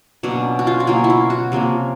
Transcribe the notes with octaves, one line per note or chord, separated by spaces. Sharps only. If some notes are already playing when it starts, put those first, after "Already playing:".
B2 F#3 A#3 C#4 D4
F#4
F4
F#4
B2 F#3 A#3 C#4 F4
E4
F4
F#4
C3 F3 A#3 C#4